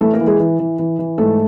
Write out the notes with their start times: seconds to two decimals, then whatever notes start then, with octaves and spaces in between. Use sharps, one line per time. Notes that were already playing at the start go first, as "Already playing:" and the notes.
0.01 E3 A3 A4
0.13 A#3 A#4
0.20 E3
0.27 G#3 G#4
0.40 E3
0.60 E3
0.79 E3
0.99 E3
1.18 G#2 A3 A4